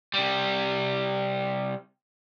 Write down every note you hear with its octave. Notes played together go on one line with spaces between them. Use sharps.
C3 G3